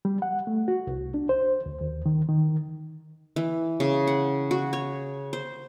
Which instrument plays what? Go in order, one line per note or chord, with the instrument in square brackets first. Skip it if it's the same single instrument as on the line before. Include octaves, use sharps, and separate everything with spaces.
[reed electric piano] G3
F#5
A3
F#4
C2
D4
C5
D2
D#2
D#3
D#3
[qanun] E3
C#3
F#5
F#4
C#5
C5